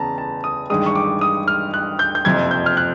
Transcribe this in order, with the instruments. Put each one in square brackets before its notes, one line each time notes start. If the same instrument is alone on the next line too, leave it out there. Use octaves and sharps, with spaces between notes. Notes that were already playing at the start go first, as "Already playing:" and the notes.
Already playing: [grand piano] E2 C#3 B3 A5 A#5
A5
D#6
A1 G2 D#3 G#3 D#6
C#6
D6
D#6
F6
F#6
G6
G6
F#1 F2 C3 F3 G#6
G6
F6
F#6